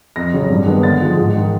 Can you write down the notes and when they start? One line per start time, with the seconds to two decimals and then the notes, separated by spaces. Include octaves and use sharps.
0.16 F2 A#6
0.34 C#3 F#3
0.50 G2
0.66 D#3 G#3 B3 D4
0.83 D3 A6
1.01 F3 G#3
1.17 G#2
1.34 D#3 G#3